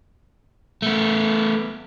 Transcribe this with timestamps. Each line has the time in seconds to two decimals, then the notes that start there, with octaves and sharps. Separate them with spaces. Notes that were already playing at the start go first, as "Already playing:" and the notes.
0.82 A3 B3